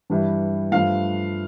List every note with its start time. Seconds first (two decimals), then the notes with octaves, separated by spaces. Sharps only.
0.10 G2 E3 G3
0.72 G2 F3 A3 F5